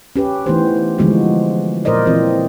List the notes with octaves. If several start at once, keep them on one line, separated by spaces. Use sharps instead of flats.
C#4 G4 B4
E3 A3 B3 D#4 G4 C5
D3 E3 F3 G#3 B3 F#4
A#2 A#4 C5 D5 D#5
E3 C4 F4 A#4